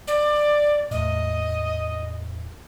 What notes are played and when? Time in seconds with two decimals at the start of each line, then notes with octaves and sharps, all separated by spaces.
0.08 D5
0.91 E2 A2 D#5